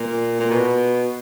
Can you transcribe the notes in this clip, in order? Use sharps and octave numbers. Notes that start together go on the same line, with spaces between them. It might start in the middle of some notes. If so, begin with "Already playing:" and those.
Already playing: A#2
A#2
B2